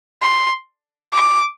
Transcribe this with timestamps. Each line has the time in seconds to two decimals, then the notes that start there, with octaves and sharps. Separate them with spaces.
0.22 C6
1.12 D6